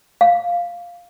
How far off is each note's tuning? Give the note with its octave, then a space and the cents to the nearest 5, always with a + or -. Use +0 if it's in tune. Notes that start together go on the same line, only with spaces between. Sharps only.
F5 +0